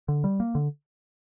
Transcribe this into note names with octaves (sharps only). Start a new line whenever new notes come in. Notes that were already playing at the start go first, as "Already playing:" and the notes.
D3
G3
A#3
D3